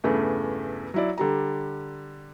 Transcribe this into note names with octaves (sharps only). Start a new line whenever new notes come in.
E2 G2 C#3 A3
F#3 E4 D5
D3 G3 A#5